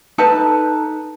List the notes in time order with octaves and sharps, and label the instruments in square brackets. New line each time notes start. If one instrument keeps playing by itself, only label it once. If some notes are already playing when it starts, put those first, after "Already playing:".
[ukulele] D#4 A4 B4 A5